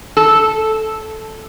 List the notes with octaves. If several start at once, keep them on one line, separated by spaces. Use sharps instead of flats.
A4